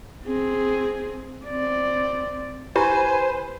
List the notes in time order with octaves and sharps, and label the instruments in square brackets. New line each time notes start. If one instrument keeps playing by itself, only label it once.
[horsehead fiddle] C4 G#4
C4 D5
[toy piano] E4 G4 [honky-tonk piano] B4 [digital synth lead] C5 [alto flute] G#5